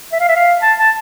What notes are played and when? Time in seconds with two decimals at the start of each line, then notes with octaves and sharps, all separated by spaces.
0.13 E5
0.20 F5
0.28 E5
0.36 F5
0.61 A5
0.79 A5